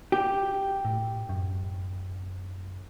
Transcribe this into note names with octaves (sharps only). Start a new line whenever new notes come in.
G4
A2
F#2